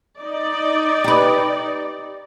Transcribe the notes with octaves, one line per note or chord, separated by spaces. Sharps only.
D#4 D5
G4 B4